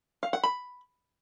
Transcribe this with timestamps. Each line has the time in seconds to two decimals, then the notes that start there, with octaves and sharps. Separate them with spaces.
0.23 F5
0.33 F#5
0.43 B5